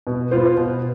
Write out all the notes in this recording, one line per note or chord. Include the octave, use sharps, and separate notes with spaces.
B2
B3 F4 C5
B2